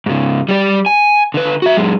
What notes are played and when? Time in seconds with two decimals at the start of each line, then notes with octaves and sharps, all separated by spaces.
0.06 G#2 C#3
0.49 G3 D5
0.86 G#5
1.34 D3 B4
1.62 F#4 E5
1.77 F#2 G#3